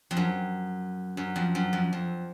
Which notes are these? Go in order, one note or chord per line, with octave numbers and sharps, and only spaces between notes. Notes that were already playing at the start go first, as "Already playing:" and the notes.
F2
F#2
F#2
F2
F#2
F2
F2